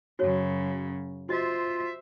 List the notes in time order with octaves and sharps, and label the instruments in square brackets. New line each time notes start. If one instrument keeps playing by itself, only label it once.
[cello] F#2 C#3 [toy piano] F#4 C#5
[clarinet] F4 [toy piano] F#4 D#5 [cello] C5 E5